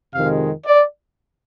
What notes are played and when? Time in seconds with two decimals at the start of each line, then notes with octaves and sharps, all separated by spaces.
0.13 F2 C3 D#3 G#3 F5
0.66 D5